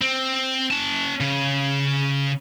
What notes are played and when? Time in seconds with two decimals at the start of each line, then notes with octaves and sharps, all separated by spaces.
0.01 C4
0.71 C#4 A5
1.20 C#3